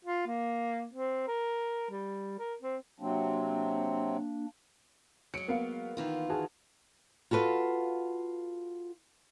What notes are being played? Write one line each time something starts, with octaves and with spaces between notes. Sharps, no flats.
F4
A#3
C4
A#4
G3
A#4
C4
C3 F#3 A#3 C4 D4
F#3 G#3 C#7 D7
A#3 B3 F5
D#3 E3 F4
F#4 G#4 A5
F4 F#4 A4 B4 F5